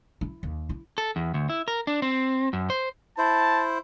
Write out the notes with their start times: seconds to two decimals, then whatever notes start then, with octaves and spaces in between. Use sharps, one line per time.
0.21 E4
0.43 D#2
0.69 E4
0.98 A4
1.16 E2
1.34 D2
1.49 E4
1.68 A#4
1.87 D4
2.02 C4
2.53 F#2
2.70 C5
3.18 E4 C5 A5